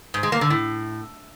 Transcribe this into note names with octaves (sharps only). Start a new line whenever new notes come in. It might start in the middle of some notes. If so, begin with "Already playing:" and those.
G#2
G#3
A#3
D3
A2